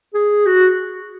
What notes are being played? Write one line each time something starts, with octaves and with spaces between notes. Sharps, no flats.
G#4
F#4